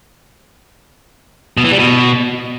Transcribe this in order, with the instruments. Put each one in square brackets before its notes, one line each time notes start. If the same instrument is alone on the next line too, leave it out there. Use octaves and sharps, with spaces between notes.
[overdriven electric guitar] B2
E3
G3
B2